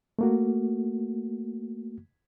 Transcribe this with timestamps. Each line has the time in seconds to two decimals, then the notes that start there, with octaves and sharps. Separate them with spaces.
0.19 A3 A#3 F#4